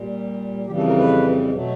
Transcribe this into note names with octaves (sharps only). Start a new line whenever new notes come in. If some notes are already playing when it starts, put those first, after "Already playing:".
Already playing: A#2 G3
F2 C#3 E3 G3 G4
A4
A#4
B4
B2 F#3 A3